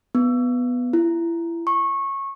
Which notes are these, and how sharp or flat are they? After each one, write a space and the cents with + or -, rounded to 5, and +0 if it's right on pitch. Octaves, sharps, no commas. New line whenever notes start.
B3 +0
E4 +30
C#6 -20